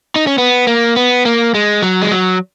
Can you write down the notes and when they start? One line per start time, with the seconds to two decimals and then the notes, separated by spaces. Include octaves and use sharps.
0.16 D#4
0.27 C#4
0.38 B3
0.67 A#3
0.96 B3
1.25 A#3
1.54 G#3
1.82 F#3
2.01 G#3
2.11 F#3